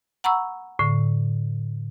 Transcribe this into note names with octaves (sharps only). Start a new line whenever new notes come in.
F#5 A#5 B5 C#6 E6
A2 D3